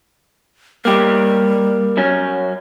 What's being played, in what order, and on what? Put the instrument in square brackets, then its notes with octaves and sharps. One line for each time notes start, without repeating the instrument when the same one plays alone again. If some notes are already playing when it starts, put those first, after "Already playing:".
[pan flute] G3 [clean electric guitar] A#3 G4
[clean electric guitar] F#2 F#3 C#4